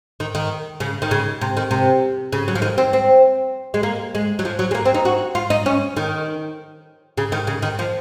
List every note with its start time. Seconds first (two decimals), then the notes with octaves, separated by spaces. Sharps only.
0.20 D#3
0.35 D#3
0.80 C#3
1.02 D#3
1.11 C#3
1.41 C3
1.57 D#3
1.71 C3
2.33 C#3
2.48 F#3
2.55 F3
2.62 D#3
2.78 C4
2.93 C4
3.74 G#3
3.83 A#3
4.15 G#3
4.39 F#3
4.45 F3
4.59 F#3
4.71 G#3
4.75 A#3
4.85 C4
4.95 D#4
5.05 F#4
5.35 F4
5.50 D#4
5.66 C#4
5.96 D#3
7.18 C#3
7.32 D#3
7.47 C#3
7.62 D#3
7.79 F3